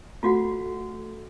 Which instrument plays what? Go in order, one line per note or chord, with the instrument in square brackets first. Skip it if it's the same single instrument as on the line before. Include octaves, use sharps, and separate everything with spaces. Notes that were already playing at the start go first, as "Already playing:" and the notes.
[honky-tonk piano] A3 [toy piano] F4 F#4 F#5